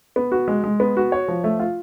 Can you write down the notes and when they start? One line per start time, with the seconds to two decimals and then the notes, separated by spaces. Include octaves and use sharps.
0.16 B3
0.32 F#4
0.48 G#3
0.64 G#3
0.80 B3
0.97 F#4
1.12 C#5
1.28 F3
1.44 A3
1.60 F4